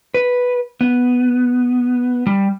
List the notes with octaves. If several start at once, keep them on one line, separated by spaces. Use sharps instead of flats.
B4
B3
G3